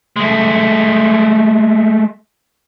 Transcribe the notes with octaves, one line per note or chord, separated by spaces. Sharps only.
G#3 A3